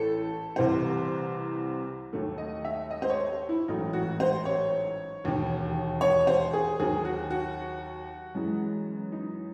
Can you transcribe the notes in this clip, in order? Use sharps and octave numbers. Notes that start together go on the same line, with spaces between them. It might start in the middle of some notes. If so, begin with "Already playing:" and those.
Already playing: A1 A2 A3 A4
C2 C3 E3 C5
D#2 D#3 F#3 A3
D#5
E5
D#5
C5
C#5
E4
A1 G#2 F#3 A3 D#4
F#4
C5
C#5
E1 D#2 D#3
C#5
C5
G#4
D#2 D#3 F#3 G#4
F#4
F#4
F#2 E3 G#3
D#4